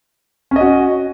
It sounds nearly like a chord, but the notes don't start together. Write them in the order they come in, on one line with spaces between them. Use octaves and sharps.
C#4 D#5 F#4